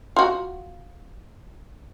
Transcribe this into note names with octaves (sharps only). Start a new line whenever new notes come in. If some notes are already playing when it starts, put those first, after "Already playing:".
F4 F#4